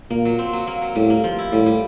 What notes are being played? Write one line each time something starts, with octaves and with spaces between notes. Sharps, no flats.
A#2 A#3
F#3
C4
F#3
A#3
F#3
A2 G3
A#3
F3
E4
A2 G3
G3